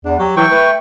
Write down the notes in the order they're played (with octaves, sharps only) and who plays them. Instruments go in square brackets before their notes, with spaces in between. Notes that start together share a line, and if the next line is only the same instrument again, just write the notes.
[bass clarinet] E2 [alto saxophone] D4
[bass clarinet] F#3 [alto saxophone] G4
[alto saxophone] E3 [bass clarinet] F#3 [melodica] G5 C#6
[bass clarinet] A3 [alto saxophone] B4